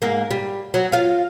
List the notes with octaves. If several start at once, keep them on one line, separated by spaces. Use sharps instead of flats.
G#2 A#3
G3
F#3
F4 F5